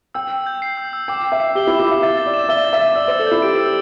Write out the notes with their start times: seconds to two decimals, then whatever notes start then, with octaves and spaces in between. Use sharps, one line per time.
0.14 G5 E6
0.31 E6
0.46 G6
0.62 C7
0.77 E6
0.93 E6
1.08 G5 D6
1.25 D6
1.32 E5
1.40 C7
1.55 G4 G7
1.67 E4
1.71 D6
1.80 E4
1.87 E5 D6
2.02 E5 A6
2.17 A6
2.26 D5
2.34 E7
2.49 E5 G7
2.65 A6
2.73 E5
2.81 A6
2.96 D5 E6
3.08 C5
3.11 E6
3.19 A4
3.27 E4 G6
3.42 G4 D7
3.58 E6